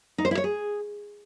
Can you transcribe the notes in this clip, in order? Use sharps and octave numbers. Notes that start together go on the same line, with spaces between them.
D#4
C5
E4
C#5
G#4